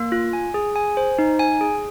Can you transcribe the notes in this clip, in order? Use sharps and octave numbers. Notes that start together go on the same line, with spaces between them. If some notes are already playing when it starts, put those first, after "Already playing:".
Already playing: A#3
F4
G#5
G#4
G#5
C5
D#4
G#5
G#4